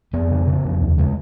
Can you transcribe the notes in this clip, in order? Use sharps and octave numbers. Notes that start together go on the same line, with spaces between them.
F2 B3
C#3
C#3
F2
D#2
C#3 G#3